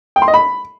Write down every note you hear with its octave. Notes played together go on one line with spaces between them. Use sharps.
G5
C6
D#5
B5